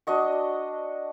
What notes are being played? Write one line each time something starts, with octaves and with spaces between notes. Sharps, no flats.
D4 F#4 D#5 C#6